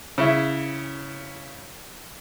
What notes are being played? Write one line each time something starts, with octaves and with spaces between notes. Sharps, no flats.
C#3 E4